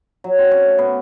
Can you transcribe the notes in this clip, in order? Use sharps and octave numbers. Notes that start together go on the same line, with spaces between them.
F#3
C4
C#4
A3
B3